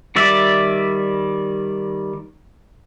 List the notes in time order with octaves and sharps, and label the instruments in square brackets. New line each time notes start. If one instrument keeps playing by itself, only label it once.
[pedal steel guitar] D#3 G3 D5 E5